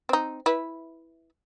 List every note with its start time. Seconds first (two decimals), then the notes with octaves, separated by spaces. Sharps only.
0.09 C4 D#4
0.46 E4 B4